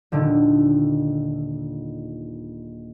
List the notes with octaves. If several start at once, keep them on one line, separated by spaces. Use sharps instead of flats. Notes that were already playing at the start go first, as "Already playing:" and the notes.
D#1 D3 D#3